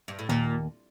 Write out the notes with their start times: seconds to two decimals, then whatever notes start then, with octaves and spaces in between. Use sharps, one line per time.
0.08 G2
0.19 A2
0.29 D#2 A#2